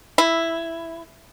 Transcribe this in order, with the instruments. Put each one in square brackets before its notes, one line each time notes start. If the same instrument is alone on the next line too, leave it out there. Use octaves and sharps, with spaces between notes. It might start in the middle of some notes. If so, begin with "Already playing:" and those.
[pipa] E4